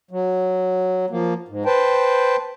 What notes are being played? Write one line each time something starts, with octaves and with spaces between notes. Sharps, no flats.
F#3
F3 A#3
G#2
B4 C5 G5 A5